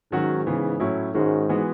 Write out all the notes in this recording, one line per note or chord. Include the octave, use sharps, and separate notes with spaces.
G#2 D#3 F#3 C#4 F#4
C#3 E3 B3
A2 F#3 C#4 E4
G#2 D#3 G#3 C#4 F#4
E3 G#3 B3 F#4